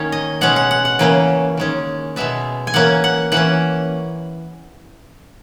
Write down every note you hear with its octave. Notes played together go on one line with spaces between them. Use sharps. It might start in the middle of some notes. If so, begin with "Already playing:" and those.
Already playing: D#3 A#3 C#4 C#5
D#5
B2 G#3 C#4 F#5
F#5
F#5
F#5
C#3 E3 A#3 C#4
D#3 G#3 C#4
B2 G#3 B3 E5
G#5
E3 A#3 C#4 F#5
F#5
E3 A#3 C#4 F#5